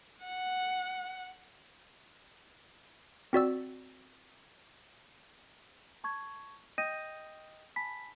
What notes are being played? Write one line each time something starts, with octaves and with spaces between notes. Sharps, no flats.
F#5
C4 F#4 D5 E6
A5 C#6 G#6
D#5 G5 D#6 G6 A#6 D#7
G#5 A5 B5 B6